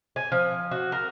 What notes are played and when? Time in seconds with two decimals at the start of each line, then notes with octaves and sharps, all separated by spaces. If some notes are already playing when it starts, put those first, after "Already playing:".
0.16 G#5
0.32 F3
0.71 F#4
0.92 A#4